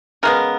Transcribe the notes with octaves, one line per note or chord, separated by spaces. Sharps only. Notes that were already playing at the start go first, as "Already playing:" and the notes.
C#3 G#3 B3 A#4